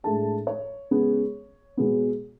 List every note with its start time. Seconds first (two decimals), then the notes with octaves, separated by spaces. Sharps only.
0.04 A2 G#3 D4 A5
0.47 C#5
0.91 C#3 G#3 B3
1.77 B2 G#3 B3